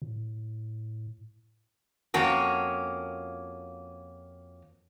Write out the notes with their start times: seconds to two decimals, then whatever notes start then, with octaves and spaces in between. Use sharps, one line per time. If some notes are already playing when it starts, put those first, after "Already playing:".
0.02 A2
2.14 F2 A#3 C#4 F#4